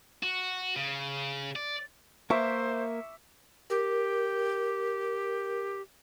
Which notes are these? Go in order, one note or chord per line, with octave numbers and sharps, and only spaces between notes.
F#4
C#3
D5
A#3 A#4 C5 E5 C#6 D6
G4 A#4